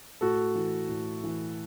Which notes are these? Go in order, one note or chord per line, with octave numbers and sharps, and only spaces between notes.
A2 F#4 A4
E3
A2
E3